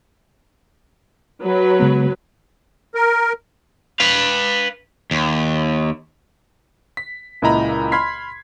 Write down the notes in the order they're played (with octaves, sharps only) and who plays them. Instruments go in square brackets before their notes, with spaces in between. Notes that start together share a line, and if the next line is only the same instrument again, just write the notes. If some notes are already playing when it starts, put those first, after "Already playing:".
[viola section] F#3 B4
[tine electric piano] C#3 G#3 B3
[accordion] A#4
[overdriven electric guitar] B4 F5
D#2
[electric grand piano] B6
C#2 A#2 E4 D#5 A#5 B5
B5 C6 F6 G#6 B6 C7